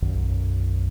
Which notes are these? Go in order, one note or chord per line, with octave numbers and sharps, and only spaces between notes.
B1 F#2 D#3